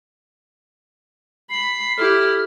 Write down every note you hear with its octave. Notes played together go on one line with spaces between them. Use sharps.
B5 C7
E4 G4 A4 F6